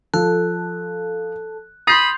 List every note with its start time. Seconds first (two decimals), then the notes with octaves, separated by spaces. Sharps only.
0.14 F3 A4 F#6
1.87 B5 C6 D#6 G6 A6 C7 F7